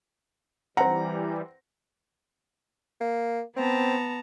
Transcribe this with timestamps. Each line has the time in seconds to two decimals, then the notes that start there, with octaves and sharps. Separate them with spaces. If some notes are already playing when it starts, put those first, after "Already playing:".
0.77 E3 G3 C4 F#5 A#5
3.01 A#3
3.56 B3 C4 A5 A#5